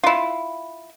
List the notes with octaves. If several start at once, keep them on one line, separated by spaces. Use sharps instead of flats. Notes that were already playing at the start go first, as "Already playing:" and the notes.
E4 F4